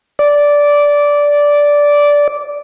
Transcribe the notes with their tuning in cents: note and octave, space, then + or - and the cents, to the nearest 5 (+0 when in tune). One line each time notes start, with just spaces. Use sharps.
D5 -10